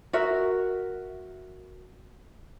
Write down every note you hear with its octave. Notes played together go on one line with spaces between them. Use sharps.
F#4 A#4 E5